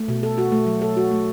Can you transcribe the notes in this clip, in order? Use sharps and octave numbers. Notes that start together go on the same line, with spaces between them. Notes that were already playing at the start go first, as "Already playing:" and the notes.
Already playing: A3
B2
A4
F#4
A3
F#3
A4
F#4
A3